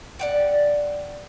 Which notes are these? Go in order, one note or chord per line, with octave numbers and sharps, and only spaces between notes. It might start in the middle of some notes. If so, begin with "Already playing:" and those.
D5 F#5 G5